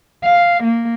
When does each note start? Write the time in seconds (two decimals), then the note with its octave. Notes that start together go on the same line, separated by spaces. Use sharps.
0.24 F5
0.64 A#3